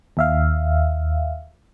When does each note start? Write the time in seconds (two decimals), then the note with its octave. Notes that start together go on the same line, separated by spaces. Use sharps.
0.17 D#2 E5 F5